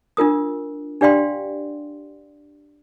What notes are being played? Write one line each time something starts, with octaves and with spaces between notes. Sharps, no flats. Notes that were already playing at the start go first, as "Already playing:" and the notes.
D4 F4 A#4 D#6
D4 G4 D5 F5 G5 C6